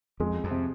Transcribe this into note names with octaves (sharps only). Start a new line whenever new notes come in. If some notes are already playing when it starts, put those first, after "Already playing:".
F2 G#3
F2
C3